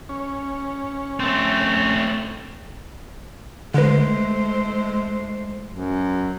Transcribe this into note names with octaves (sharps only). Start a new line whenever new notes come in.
C#4
A3 C4
D3 G#3 A3 B4 C5
F#2